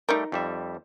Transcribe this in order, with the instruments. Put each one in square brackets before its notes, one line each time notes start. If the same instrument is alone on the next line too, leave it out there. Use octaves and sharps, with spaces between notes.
[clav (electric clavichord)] G3 A3 G5 [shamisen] D#4 A#4
[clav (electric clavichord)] F2 G3 E5